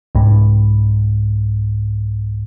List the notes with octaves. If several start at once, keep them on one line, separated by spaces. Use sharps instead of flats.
C2 G#2